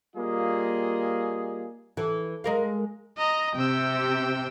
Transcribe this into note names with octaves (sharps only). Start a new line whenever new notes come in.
G3 A#3 F4 G#4 D#5
E3 A4
G#3 A#4 F5
D#5 A#5
C3 G5 E6